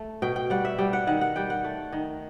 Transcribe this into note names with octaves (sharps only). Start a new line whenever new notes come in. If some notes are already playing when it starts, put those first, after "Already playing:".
Already playing: A3
B2 G5
G5
G3 F#5
E5
G3 G5
F#5
D#3 F#5
F#5
G3 G5
F#5
A3
D#3